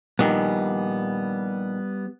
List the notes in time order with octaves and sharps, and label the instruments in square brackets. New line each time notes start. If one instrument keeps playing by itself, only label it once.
[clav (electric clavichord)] A#1 D#3 [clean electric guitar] G3 B3